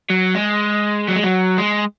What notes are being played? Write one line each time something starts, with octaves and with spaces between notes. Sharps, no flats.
F#3
G#3
F#3
G#3
F#3
G#3